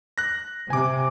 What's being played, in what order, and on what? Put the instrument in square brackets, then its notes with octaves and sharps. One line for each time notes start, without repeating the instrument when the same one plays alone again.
[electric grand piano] F#6 A#6
[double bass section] C3 [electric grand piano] G#5 D6